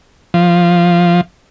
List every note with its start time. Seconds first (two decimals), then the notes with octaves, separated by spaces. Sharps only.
0.34 F3